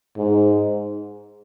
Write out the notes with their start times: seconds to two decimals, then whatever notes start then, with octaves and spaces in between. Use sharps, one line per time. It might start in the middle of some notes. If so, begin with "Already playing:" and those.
0.17 G#2